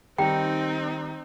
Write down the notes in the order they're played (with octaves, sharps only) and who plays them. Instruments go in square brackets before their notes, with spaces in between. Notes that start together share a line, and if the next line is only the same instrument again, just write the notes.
[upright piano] D#3 G3 A#5 [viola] C4 D#4 [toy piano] G5